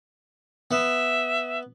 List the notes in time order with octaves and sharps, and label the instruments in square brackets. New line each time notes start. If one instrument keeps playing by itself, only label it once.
[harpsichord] B3 [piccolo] E5